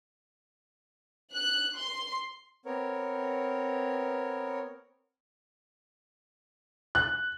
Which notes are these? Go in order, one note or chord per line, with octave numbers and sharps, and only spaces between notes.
F#6
C6
B3 C4 A#4 C#5
F#6